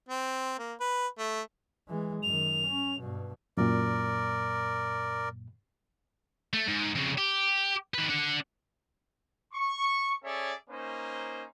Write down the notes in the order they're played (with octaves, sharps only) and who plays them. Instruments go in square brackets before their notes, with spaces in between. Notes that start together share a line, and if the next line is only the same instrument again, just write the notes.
[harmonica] C4
A#3
B4
A3
[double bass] E3 G#3
[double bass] F#2 D#3 [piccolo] F7
[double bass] C#4
G2 B2
[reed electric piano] F#2 A#2 [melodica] A#4 D5
[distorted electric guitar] A3
G#2
F2 C#3
G4
D#3 B4
D4 F#5
[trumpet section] C#6
C#4 G#4 A4 C#5 D5 E5
A#3 C#4 D#4 C5